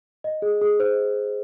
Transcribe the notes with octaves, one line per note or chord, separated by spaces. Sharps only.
D#5
G#4
G#4
C5